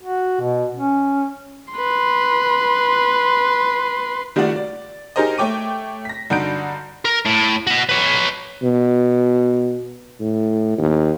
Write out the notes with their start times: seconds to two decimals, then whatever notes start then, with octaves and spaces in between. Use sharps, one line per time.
0.03 F#4
0.41 B2
0.75 C#4
1.73 B4 C6
4.36 D#3 G3 A3 F4 F#4 D5
4.56 D5
5.16 D#4 G4 G#4 A#4 C5 D#5
5.38 A3 C#5 G5 D6 D#7
6.05 A#6 B6
6.30 G2 D3 D#4 F#4 G6 D7
7.05 A#4
7.26 A2
7.67 F#4 B5
7.89 B4 C#5
8.62 B2
10.20 A2
10.78 D#2